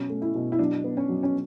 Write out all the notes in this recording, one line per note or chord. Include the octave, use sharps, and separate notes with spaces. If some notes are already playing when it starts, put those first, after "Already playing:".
Already playing: B2 F#3 C#4
A3
E4
B2
E4
F#3 D4
B3
C#4
F#3
C#4